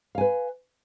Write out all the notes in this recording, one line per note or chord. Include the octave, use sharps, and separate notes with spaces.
B4 F5 G#5